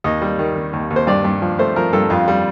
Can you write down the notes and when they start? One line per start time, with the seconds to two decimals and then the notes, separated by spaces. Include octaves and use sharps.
0.04 D#2 D#5
0.22 G3
0.39 D#3
0.56 D#3
0.73 D#2
0.91 D#2
0.96 C5
1.07 G2 D5
1.24 G2
1.42 F3
1.59 A3 C5
1.76 F3 A#4
1.93 G2 A4
2.10 F2 F4
2.28 G3